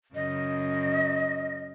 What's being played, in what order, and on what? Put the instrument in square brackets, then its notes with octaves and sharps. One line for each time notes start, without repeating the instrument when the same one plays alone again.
[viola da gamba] F#2 C#3 [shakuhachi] D#5